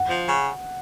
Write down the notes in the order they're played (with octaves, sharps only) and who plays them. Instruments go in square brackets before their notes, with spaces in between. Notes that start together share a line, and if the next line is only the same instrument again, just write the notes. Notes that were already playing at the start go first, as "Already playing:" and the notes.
Already playing: [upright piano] F#5
[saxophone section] F3
C#3